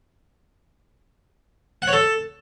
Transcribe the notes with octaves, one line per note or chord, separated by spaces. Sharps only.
F#5
C#5
A4